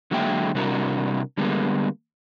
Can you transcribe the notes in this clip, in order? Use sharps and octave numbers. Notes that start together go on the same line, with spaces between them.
D3 F#3 G#3 A#3 E5 G5
C3 G3 D4 E4 F#4 A#4
D3 G3 G#3 A#3 B3